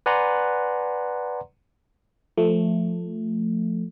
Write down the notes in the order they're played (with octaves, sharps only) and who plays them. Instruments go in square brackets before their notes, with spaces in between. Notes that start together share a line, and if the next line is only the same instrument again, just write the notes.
[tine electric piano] B4 D5 F#5 G#5 A#5 C6
[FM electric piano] F3 A3